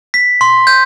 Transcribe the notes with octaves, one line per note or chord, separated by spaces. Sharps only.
B6
C6
G6